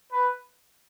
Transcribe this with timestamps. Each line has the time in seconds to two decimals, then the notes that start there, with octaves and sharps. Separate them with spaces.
0.12 B4